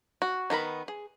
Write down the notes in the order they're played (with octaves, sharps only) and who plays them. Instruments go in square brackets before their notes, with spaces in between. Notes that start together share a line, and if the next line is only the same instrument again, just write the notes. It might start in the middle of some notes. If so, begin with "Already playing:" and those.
[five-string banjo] F#4
D#3 B3 A#4 B5
G#4